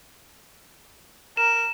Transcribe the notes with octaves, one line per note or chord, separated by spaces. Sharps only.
A#4 E7